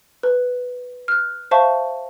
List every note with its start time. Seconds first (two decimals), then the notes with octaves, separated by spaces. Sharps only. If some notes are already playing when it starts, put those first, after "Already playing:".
0.23 B4
1.08 F6 F#6
1.51 C5 E5 F5 A5 C#6